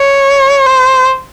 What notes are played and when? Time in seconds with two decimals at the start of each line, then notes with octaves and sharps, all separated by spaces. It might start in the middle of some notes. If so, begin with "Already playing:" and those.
Already playing: C#5
0.66 C5